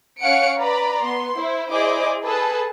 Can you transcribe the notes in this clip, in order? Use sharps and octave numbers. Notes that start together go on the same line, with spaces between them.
C#4 C#5 F5 F#5 C#7 D7
B4 D5 A#5 B5
B3 C6
E4 C5
E4 G#4 C5 D5 D#5 D6
G#4 A4 B4 A5